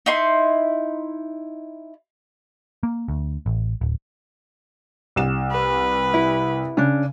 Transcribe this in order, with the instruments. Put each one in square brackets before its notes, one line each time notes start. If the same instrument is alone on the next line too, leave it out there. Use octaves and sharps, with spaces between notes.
[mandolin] D#4 E4 C6
[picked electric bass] A#3
D2
A1
D1
[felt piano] C2 E7
[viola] B4
[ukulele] E4
[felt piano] C#3 [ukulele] C#4 D4